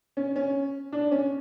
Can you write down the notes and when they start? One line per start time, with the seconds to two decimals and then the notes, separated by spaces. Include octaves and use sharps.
0.17 C#4
0.36 C#4
0.92 D4
1.11 C#4